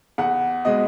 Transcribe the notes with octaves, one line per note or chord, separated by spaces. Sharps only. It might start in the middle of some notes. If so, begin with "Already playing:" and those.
E2 F#5
B2 G#3 D#5